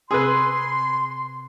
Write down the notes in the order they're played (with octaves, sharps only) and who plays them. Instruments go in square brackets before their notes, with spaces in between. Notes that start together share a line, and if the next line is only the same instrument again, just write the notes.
[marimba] C3 C4 E6 [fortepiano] G#4 B4 [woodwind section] C6